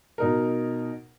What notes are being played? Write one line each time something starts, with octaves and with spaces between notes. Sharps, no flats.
B2 D#4 A#4